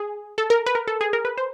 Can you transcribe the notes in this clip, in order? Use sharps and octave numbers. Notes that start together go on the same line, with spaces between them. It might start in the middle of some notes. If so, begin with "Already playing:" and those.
Already playing: G#4
A4
A#4
B4
A#4
A4
G#4
A#4
B4
C5